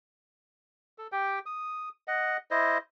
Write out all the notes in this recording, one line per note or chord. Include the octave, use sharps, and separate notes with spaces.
A4
G4 G5
D#6
D#5 F#5
E4 C5 D#5